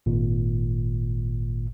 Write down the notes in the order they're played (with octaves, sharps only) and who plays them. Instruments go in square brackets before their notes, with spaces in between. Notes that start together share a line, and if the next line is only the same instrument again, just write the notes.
[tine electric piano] G#1 A#2